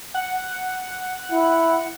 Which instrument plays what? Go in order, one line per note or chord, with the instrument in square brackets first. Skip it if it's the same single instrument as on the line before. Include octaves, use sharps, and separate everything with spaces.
[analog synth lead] F#5
[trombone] E4